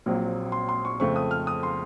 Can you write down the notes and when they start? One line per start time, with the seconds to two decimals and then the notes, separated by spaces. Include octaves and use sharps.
0.06 A#1 A#2 F#3 C4
0.52 C6
0.69 C6
0.85 C#6
1.00 F2 C#3 A3 C4 C#6
1.16 D#6
1.31 F6
1.47 D#6
1.63 C6